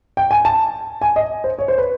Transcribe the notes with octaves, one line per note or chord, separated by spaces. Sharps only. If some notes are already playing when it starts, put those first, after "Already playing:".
G5
G#5
A5
G#5
D#5
C5
C#5
C5
B4